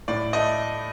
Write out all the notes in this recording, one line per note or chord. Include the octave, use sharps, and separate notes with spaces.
A2 D5
A3 D#5